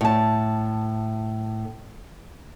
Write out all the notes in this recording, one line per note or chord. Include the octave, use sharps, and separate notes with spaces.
A2 A5